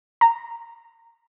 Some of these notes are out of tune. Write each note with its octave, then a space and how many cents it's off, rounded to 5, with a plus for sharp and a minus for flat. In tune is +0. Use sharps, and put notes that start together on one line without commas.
A#5 -15